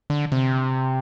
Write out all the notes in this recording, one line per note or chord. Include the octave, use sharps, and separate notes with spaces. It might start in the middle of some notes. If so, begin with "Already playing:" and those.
D3
C3